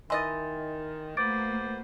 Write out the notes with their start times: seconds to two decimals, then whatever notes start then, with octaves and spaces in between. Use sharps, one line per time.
0.10 D#3 E3 D#5 C6 A6
1.17 A3 A#3 F#4 B4 C5 D6 A6 D7